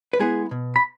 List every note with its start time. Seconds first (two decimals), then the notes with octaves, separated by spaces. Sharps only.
0.13 B4
0.19 G#3 B3 E4 G#4
0.51 B2
0.76 B5